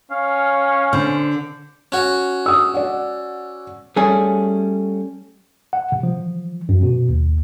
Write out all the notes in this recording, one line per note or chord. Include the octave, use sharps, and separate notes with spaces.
C#4 F5
D3 C5
C#4 F#4
D#6 E6
D5 F#5
G3 A3 C#4 G#4
F#5
C3
F3
F#2
B2
D#2